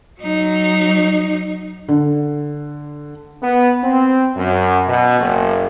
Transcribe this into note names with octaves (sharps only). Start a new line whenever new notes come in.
F#3 D#4
D3
B3
C4
F#2
B2
F#1